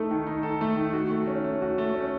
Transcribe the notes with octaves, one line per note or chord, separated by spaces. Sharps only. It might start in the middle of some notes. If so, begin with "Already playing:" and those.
Already playing: A3 D#4 A4
D#3
D#4
A4
A3
D#3
F#4
A3
C#4
A3
F#4
A3
C#4